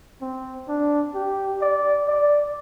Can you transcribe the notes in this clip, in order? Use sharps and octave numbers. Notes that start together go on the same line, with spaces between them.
C4
D4
G4
D5
D5